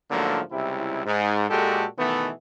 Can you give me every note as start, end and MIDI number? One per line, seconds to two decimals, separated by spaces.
0.11 0.42 44
0.11 0.42 50
0.11 0.42 53
0.11 0.42 54
0.11 0.42 57
0.11 0.42 58
0.52 1.03 37
0.52 1.03 48
0.52 1.03 55
0.52 1.03 64
1.06 1.49 44
1.50 1.87 46
1.50 1.87 56
1.50 1.87 66
1.50 1.87 67
1.50 1.87 69
1.98 2.31 47
1.98 2.31 51
1.98 2.31 52
1.98 2.31 57
1.98 2.31 59